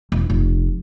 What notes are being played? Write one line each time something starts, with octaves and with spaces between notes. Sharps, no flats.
E1
F1